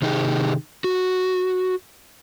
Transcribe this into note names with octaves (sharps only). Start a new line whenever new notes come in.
C3 D#3 D#4 G4 G#4
F#4